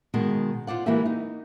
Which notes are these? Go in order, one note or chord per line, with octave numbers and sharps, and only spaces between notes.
B2 D#3 G#3
F4 C5 D5 F#5
E3 G#3 A#3 F#4 G4 E5
D#4